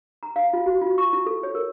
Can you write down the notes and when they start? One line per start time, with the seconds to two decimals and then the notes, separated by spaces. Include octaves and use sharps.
0.23 A#5
0.36 F5
0.53 F4
0.66 F#4
0.82 F4
0.98 C#6
1.13 E4
1.26 A4
1.43 C#5
1.55 A#4